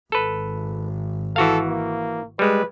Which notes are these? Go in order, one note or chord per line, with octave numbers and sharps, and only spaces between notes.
G#1 A4 B4
E3 F#4 A4 F5
A#3
G3 G#3 B4